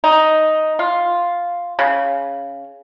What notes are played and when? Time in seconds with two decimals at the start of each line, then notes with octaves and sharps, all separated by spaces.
0.04 D#4
0.79 F4
1.79 C#3